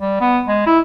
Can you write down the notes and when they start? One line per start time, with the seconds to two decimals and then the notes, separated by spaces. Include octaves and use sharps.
0.01 G3
0.21 B3
0.48 G#3
0.66 E4